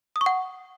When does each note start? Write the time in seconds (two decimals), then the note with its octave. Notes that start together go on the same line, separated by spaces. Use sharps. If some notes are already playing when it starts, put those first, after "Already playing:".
0.16 D#6
0.21 C#6
0.26 F#5